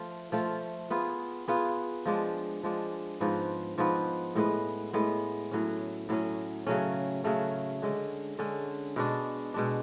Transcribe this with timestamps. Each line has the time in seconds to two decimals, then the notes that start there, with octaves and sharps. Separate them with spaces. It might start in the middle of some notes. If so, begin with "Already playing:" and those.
Already playing: F3 A3 F4
0.32 F3 A3 F4
0.90 B3 F4 G#4
1.48 B3 F4 G#4
2.06 F3 G#3 D4
2.63 F3 G#3 D4
3.20 G#2 F3 B3
3.78 G#2 F3 B3
4.35 A2 G#3 B3
4.93 A2 G#3 B3
5.51 A2 F#3 C#4
6.09 A2 F#3 C#4
6.67 C#3 F#3 A3 C#4
7.24 C#3 F#3 A3 C#4
7.82 D3 G#3 C#4
8.39 D3 G#3 C#4
8.96 B2 G#3 D4
9.54 B2 G#3 D4